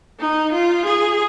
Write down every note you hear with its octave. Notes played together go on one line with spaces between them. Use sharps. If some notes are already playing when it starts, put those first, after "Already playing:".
D#4
F4
G#4